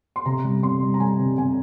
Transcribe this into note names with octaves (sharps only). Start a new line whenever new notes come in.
C6
C3 A#5
G3
C3 C6
G3
A#5
G3 G#5
C3
C3 G#5